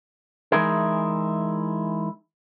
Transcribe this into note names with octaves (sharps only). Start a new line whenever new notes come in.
E3 G#3 D#4 E4 G#4 A#4